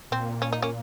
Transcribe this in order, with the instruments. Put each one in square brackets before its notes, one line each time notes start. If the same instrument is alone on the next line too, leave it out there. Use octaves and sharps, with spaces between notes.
[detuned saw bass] A#2 [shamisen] C4
[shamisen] C#4
D#4
A#3 C#4